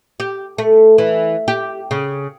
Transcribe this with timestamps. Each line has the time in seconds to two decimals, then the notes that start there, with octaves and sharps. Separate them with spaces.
0.20 G4
0.58 A3
0.98 E3
1.48 G4
1.91 C#3